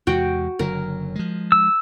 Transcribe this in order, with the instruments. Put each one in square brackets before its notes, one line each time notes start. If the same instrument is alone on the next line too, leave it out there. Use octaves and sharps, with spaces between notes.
[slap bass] E2 C3 G#3 [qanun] F#4 G5
[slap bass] F#1 D3 F#3 [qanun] A#4
[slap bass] F3 G#3
[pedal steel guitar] E6